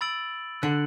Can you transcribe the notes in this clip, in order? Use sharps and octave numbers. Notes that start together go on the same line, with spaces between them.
B5 E6 A6 D7 F#7
D3 F#6 C#7 F#7